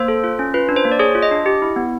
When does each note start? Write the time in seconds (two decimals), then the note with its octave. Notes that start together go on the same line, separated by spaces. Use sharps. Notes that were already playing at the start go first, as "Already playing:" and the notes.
Already playing: A#3 C5
0.08 A4
0.24 F4
0.39 C#4
0.54 F4 B4
0.69 D4
0.76 C5
0.85 A#3
0.92 D5
0.99 G#4 C#5
1.15 F4
1.22 D#5
1.31 D4
1.46 G4
1.62 E4
1.76 B3